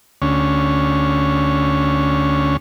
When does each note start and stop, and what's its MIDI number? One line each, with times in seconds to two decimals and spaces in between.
0.22 2.57 38
0.22 2.57 61